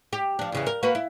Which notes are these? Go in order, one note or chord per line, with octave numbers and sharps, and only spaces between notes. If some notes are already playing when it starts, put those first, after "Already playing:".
G4
F3 D4
E2 C#3 E3
A#4
A#3 F#4 B4
E4